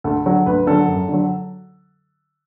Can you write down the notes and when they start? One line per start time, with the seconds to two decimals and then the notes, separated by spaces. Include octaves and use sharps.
0.04 D2 A4
0.25 D3 F#3
0.46 D2 B4
0.66 D3 F#3 A4
0.88 F#2
1.08 D3
1.14 F#3